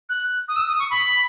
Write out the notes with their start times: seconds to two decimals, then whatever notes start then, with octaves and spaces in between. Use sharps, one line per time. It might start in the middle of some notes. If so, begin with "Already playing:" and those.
0.09 F#6
0.48 D#6
0.56 E6
0.68 D#6
0.79 C#6
0.91 B5